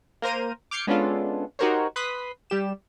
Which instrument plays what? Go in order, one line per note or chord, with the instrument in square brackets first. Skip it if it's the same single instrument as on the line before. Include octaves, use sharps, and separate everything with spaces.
[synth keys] A#3 A#4 C5 A#5 D#7
D6 F6 G6 G#6 C7 C#7
G#3 B3 C#4 D4 F4 A4
D#4 F#4 G4 A#4 C5 C#5
B4 C6 D#6 F#6 B6
G3 G4 E7